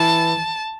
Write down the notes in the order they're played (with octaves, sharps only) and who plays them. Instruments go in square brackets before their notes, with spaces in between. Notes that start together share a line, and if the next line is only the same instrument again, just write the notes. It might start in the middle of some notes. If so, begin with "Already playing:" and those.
Already playing: [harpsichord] E3 E4 [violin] A5